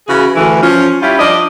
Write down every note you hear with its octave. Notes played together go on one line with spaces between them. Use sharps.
C#3 E3 F#4 G#4
D2 E3
F3 C#4
G3 C#4 E4 F4
F3 D4 D5 D#5